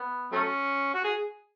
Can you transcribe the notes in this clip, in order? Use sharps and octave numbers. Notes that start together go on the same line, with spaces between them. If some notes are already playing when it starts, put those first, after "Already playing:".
Already playing: B3
F#3 A3 C#4
F#4
G#4